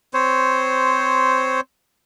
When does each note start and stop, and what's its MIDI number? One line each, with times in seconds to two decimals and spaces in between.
0.14 1.60 60
0.14 1.60 72
0.14 1.60 73